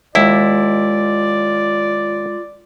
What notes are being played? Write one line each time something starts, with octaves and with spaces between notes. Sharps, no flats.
D#2 G#3 E4 F4 D5 E5